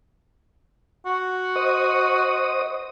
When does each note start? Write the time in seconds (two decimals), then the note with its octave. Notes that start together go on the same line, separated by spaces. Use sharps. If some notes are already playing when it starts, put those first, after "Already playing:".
1.06 F#4
1.56 C5 D#5 D#6